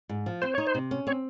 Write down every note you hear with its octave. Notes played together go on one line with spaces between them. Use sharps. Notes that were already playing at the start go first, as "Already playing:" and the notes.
G#2
F3
C4 C5
D#4 C#5
C5
C3
C#4
C4 C#5